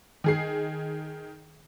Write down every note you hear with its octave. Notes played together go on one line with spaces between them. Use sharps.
D#3 G#4 C7